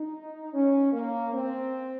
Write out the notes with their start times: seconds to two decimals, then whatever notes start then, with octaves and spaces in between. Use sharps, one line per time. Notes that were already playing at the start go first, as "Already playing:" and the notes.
Already playing: D#4
0.54 C#4
0.93 A#3
1.32 C4